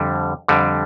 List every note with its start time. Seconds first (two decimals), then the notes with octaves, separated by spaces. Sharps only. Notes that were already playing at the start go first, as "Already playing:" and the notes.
Already playing: F2 D3 G3
0.48 F2 D3 G3